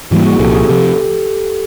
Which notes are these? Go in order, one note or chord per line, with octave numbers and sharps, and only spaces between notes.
G#2 E3 G3 A#3 E4 F#4
F#4 G#4
C2 A#2 F3 G4 A4
F#4 G#4
C3 F3 G4 A4